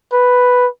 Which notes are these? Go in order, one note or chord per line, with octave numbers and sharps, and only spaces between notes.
B4